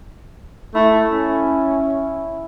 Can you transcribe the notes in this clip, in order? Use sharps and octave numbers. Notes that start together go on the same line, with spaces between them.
A3 E4
C#4